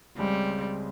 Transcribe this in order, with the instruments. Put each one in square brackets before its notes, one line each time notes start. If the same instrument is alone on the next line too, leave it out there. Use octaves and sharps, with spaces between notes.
[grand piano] C#2 C#3 G#3 C4 [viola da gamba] G3